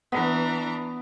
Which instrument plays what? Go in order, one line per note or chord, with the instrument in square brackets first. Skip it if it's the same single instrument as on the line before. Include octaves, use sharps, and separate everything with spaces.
[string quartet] E3 D4 A#5 [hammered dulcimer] B3